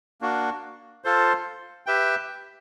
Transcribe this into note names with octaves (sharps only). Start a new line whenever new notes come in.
A#3 D4 F#4
F4 A4 C5
G4 B4 E5 G5